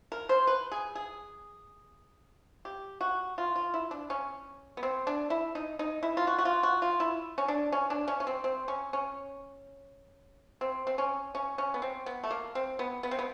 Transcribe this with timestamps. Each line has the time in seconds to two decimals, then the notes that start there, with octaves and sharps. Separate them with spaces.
0.12 A#4
0.29 C5
0.47 B4
0.72 G#4
0.95 G#4
2.65 G4
3.01 F#4
3.38 F4
3.56 F4
3.74 E4
3.91 D4
4.10 C#4
4.77 B3
4.83 C4
5.07 D4
5.30 E4
5.55 D#4
5.79 D#4
6.03 E4
6.17 F4
6.27 F#4
6.38 F#4
6.45 F4
6.63 F#4
6.82 F4
7.00 E4
7.38 C#4
7.48 D4
7.72 C#4
7.90 D4
8.08 C#4
8.20 C#4
8.27 C4
8.44 C4
8.68 C#4
8.93 C#4
10.61 C4
10.87 C4
10.98 C#4
11.35 C#4
11.58 C#4
11.74 B3
11.82 C4
12.06 B3
12.23 A3
12.31 A#3
12.55 C4
12.79 B3
13.03 B3
13.11 C4
13.19 B3